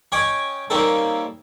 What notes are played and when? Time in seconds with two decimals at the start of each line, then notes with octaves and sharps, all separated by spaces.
0.12 C#4 C#5 D#5 G5 G#5 D6
0.70 G3 A#3 C4 C#4 D#4 A4